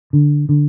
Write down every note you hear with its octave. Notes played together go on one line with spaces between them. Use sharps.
D3
D3